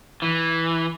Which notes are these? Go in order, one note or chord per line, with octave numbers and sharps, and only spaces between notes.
E3